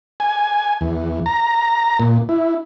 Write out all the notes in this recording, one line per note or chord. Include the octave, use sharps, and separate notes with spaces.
G#5
E2
A#5
A#2
E4